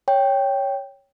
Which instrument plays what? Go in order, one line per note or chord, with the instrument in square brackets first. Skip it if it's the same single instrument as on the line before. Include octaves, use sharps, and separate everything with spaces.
[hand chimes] C#5 G5